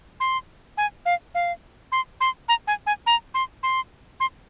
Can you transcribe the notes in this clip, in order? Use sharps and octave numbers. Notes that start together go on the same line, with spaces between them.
C6
G#5
F5
F5
C6
C6
A#5
G#5
G#5
A#5
C6
C6
C6